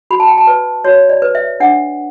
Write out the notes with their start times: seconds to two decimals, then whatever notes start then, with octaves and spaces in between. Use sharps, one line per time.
0.11 F#4 B5
0.20 A5
0.28 G5
0.38 A5
0.47 B4
0.84 F#4 C#5
1.09 D5
1.22 B4
1.35 E5
1.60 D4 F#5